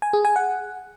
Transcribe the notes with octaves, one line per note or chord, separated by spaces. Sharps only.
G#5
G#4
G#5
F#5